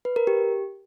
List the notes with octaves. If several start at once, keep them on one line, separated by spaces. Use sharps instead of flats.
B4
A#4
G4